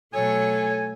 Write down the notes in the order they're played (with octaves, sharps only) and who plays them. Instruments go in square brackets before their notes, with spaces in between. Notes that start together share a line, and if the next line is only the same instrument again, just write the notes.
[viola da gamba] B2 F#3 A3 [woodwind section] A4 G#5 [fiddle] C#5